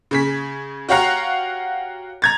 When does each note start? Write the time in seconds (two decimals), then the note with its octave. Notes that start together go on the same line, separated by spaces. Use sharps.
0.11 C#3 G#4 B6
0.89 F#4 G4 C#5 F5 F#5 A#5
2.22 A#5 G#6 A6